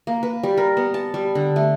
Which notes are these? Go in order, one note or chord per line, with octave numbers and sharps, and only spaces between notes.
A#3
B4
G3
A#4
B3
A5
G3
D3
A3